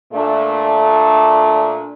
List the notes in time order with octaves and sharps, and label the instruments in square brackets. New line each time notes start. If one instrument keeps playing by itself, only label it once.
[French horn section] A#2 A3 D4